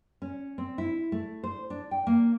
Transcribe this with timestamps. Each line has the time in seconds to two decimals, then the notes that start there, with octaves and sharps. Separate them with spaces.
0.22 C#4
0.58 C4
0.78 E4
1.12 A3
1.44 C5
1.70 D4
1.91 G5
2.07 A#3